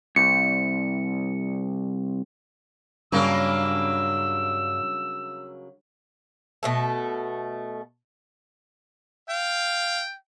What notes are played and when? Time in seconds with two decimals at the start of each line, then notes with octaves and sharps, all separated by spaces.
0.16 C2 C#7
3.12 G2 C#3 F#3 A#3 E6
6.63 B2 A3 A4
9.29 F5 G5